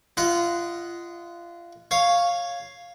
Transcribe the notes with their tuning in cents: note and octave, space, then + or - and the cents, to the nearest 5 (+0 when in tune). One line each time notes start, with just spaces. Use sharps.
F4 -25 D#5 +0 F#5 +0
C#5 +0 F5 +0